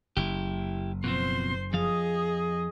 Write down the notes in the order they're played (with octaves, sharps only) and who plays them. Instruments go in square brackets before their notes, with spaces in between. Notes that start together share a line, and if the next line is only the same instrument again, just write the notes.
[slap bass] F#1 [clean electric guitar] E4 G4
[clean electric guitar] B2 F3 C4 [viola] C5 C6
[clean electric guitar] F2 F3 F5 [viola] G#4 D#5